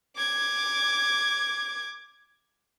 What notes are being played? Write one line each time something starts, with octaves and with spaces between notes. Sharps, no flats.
D6 G#6